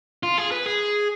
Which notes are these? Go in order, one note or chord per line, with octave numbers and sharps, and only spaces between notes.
F4
G#4
B4
G#4